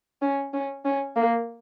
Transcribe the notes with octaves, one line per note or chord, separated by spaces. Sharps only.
C#4
C#4
C#4
A#3